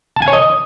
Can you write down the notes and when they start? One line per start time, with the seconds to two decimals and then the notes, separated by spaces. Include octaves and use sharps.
0.16 A5
0.22 G#5
0.28 C#5
0.33 D#5